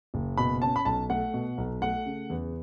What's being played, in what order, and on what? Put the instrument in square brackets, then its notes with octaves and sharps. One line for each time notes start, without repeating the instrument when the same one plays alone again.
[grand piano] F#1
B2 B5
C#4 A5
B5
B1 A5
A3 F#5
B2
B1
A3 F#5
C#3
E2